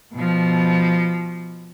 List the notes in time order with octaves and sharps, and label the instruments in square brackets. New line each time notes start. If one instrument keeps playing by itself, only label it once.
[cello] B2 F3